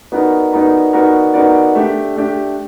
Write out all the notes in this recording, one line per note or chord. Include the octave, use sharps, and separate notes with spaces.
B3 D#4 F#4 A#4 D5
B3 D#4 F#4 A#4 D5
B3 D#4 F#4 A#4 D5
B3 D#4 F#4 A#4 D5
A3 D4 G4
A3 D4 G4